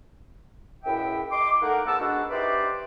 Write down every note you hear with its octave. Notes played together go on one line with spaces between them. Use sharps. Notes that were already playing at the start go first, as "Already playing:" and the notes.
C#2 F#2 A2 E5 G5
D#5 C6 D6
A3 A#3 D#4 A#4 F#5
E2 B3 F#5 A5 E6
G#3 B3 D4 F#4
D#4 G4 B4 C5 D5 E5